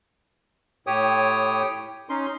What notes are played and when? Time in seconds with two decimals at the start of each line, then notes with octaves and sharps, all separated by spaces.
0.87 A2 G4 C#5 G5 D#6
2.09 C#4 D#4 C6